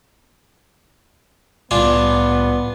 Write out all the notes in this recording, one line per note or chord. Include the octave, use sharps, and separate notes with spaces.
C2 A2 G3 B3 D4 F4 G#5